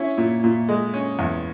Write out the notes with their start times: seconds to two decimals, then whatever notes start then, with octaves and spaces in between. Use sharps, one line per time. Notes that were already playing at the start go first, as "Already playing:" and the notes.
Already playing: C#4 E4
0.18 A#2
0.44 A#2
0.69 G#3
0.94 C#4
1.19 E2